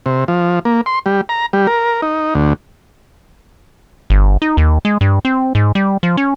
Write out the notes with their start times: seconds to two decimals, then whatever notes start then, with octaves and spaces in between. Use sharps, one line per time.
0.06 C3
0.28 F3
0.65 A#3
0.86 C6
1.06 G3
1.29 A#5
1.53 G3
1.67 A#4
2.02 D#4
2.35 D2
4.10 G1
4.42 D#4
4.57 D#2
4.85 G#3
5.01 G2
5.25 C4
5.55 G#2
5.75 G3
6.03 F3
6.17 C#4